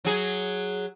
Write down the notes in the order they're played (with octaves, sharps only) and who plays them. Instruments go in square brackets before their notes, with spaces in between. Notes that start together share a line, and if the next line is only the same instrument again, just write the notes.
[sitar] F#3 G#4